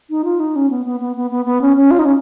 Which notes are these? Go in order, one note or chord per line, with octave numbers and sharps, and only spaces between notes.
D#4
F4
D#4
C#4
B3
B3
B3
B3
B3
B3
C#4
C#4
F4
D#4
C#4